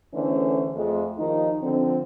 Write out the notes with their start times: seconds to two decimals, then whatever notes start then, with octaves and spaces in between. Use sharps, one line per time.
0.14 E2 D3 E3 A3 C#4 C5
0.75 F2 G#3 A3
1.19 D#2 D#3 F3 D#4
1.62 D3 F3 C4